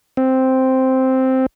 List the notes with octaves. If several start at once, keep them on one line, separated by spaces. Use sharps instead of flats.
C4